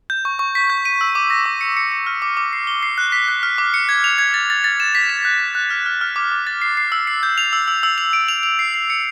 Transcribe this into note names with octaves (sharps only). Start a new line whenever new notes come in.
G6
C#6
C#6
B6
G6
D#7
E6
D6
A#6
D6
C#7
C#7
C#7
F6
D6
D6
C7
G7
C7
F#6
B6
F#6
F6
D6
C#7
G#6
F7
G#6
A6
A6
A6
E7
B6
E7
F#6
F#6
F#6
F6
F6
F6
D6
D6
A6
C7
C7
E6
C7
G6
F7
E6
E6
E6
F7
D7
F7
F7
C7
C7
C#7